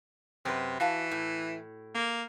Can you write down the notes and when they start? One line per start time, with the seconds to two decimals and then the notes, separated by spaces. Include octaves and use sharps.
0.45 F#2 C3 B4
0.80 E3 F#4 F5 A5
1.11 A2
1.95 A#3